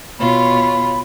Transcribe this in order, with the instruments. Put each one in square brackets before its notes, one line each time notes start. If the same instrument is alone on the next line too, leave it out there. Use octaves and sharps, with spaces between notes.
[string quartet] B2 F4 C#5 [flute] B5